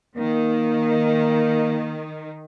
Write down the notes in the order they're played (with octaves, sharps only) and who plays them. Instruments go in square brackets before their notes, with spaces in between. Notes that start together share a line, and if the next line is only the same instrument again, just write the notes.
[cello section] D#3 [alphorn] A#3